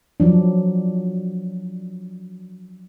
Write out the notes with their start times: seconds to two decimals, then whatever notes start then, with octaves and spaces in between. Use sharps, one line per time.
0.20 F3 F#3 D4